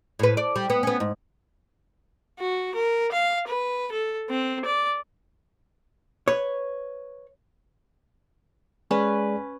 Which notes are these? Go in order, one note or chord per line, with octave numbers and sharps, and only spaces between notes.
A2 B4
D5
G3
B3
B3 C#4
G#2
F#4
A#4
F5
B4
A4
C4
D5
B4 C#5
G#3 C#4 G#4 B4 D5